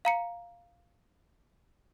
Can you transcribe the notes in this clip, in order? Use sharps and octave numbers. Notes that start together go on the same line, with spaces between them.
F5 A#5 C#7